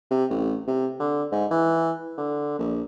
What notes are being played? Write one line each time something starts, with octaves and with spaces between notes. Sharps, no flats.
C3
A1
C3
D3
G#2
E3
D3
A#1